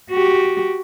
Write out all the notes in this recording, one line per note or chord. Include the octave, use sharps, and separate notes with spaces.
F#4 G4